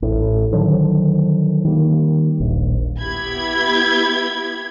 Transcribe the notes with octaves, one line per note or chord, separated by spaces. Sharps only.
A1 A2
D3 D#3 F3 F#3
D#3 G3 A#3
D#1 A#1
B3 E4 G4 B5 G#6